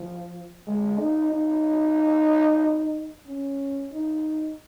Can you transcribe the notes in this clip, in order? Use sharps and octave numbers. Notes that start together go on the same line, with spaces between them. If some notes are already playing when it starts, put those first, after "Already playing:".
Already playing: F3
G#3
D#4
D#4
C#4
D#4